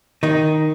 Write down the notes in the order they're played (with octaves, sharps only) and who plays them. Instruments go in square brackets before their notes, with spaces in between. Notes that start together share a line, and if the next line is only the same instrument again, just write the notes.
[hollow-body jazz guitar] D#3 D#4